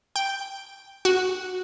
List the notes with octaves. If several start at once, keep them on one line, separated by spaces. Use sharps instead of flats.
G5
F#4